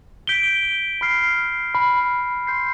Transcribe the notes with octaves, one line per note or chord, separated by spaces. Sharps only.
G6 B6 D7 G7
B5 F6 C7
B5 F6 C7
C6 G6 C7